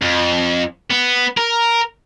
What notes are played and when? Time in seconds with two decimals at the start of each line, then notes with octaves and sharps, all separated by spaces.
0.02 F2
0.91 B3
1.37 A#4